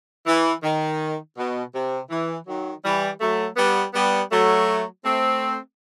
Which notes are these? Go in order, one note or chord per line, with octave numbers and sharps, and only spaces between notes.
E3
D#3
B2
C3
E3
D#3 F#3
E3 G3
F#3 A3
G3 B3
G3 B3
F#3 A3
A3 C4